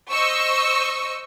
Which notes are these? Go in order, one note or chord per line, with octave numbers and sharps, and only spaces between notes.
C5 D#5 C#6 E6